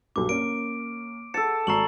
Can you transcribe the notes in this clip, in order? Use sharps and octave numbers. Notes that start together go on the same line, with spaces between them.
B1 G2 D6
A#3 C#4 D7
A4 A5 C#7
G#1 A#5 C#6 E6 C7 F#7